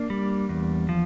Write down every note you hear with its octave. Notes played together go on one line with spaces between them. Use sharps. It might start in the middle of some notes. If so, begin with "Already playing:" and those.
Already playing: A#3 D4
G3
E2
F3